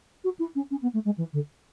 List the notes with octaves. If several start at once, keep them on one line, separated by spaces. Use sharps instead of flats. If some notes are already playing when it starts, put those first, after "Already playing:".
F#4
E4
C#4
C#4
B3
A3
G#3
E3
D3